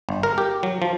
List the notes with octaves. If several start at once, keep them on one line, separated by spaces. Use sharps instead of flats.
G1
A#4
G4
F#3
F3